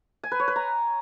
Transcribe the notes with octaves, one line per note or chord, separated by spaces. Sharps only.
G#5
B4
C#5
B4
A#5